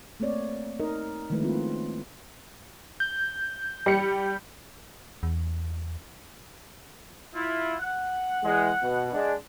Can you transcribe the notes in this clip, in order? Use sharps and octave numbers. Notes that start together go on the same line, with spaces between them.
A3 A#3 C4 C#5 D5
D#4 A#4 D#5
D#3 F3 G#3 A3 E4 B4
A#3 C4 F4
C#4
G6
G3 C#7
E2
E4 F4
F#5
E2 G#3
B2
G#3 D4